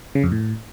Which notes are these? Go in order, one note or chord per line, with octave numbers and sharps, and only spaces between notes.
C#3
F2
A2